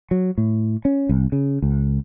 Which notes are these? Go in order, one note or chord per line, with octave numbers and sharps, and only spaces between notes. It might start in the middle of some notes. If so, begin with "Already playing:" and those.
F#3
A2
C#4
C2
C#3
C#2